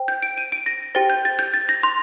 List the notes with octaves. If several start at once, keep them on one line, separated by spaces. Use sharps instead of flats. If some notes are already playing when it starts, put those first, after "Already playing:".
Already playing: C5 G5
G6
D7
D#7
D7
A#6
G4 C5 G5 A6
G6
A6
G6
A6
A#6
C6